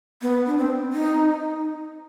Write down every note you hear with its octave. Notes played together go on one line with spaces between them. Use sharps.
B3
D4
C4
D#4